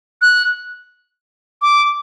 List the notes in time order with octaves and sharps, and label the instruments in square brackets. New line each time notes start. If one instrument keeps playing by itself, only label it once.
[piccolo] F#6
D6